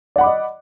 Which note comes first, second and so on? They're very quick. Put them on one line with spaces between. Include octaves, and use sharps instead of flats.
D5 F#5 B5 D6 D#5